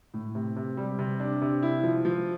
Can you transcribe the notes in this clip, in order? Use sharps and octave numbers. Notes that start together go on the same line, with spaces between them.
A2
C3
C3
G3
C3
D4
C3
E4
F3
F3